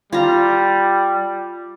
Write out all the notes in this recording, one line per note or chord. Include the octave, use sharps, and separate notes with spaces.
G3 F4 A#5